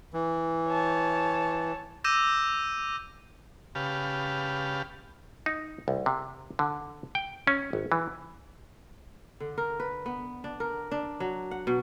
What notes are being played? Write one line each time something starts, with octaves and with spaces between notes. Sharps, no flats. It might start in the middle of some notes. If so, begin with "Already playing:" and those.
E3
C#5 A5
D6 E6 G6 A#6 D#7 E7
C#3 G4 B4 F5 A5
D#4
C2
C3
D3
G5
C#4
G#1
E3
D3
A#4
B4
B3
D4
A#4
D4
F#3
F#5
B2